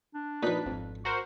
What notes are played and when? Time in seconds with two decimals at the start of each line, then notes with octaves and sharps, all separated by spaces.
0.14 D4
0.43 A#2 F3 D#4 B4 B6
0.66 G#1 F2
1.05 F#4 A#4 C5 C#6